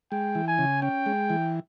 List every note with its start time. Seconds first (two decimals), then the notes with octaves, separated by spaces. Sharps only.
0.11 G#3 G5
0.35 E3
0.47 G#5
0.59 C#3
0.82 C#4 G5
1.06 G#3
1.30 E3